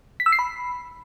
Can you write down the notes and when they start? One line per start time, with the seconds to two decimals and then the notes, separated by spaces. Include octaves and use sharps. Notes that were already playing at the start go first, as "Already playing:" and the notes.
0.20 B6
0.26 E6
0.32 C7
0.39 B5